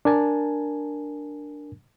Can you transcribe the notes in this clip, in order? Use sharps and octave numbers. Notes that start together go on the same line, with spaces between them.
D4 A#4 G#5 A5